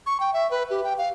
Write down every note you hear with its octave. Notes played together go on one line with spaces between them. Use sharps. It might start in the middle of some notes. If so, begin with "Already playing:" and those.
C#6
G5
E5
B4
G4
G5
F5